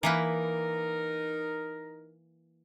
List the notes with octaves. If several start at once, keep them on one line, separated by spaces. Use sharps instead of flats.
E3 A#3 D#4 A#4 B4